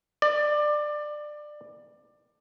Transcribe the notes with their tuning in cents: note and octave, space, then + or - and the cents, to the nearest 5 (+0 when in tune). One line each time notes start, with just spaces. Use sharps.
D5 +20